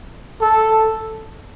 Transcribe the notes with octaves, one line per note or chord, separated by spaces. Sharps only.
A4